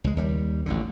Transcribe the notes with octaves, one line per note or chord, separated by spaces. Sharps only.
C#2 G#3
D#2 G3
A1 D2 D3